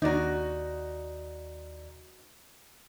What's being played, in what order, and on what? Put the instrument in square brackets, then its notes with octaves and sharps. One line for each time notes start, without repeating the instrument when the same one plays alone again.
[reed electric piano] D#2 D5 A#5 [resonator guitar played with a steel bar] D#4 F#4